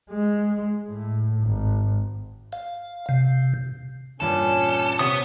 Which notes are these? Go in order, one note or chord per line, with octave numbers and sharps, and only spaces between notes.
G#3
A2
G#1
F5
C3
E2 G2 A#2 C#4 A4
C3 B3 C#5 D#6